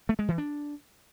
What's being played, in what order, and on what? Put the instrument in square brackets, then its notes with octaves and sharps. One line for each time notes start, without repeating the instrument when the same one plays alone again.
[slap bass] A3
G#3
E3
D4